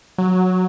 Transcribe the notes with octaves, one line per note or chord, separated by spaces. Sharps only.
F#3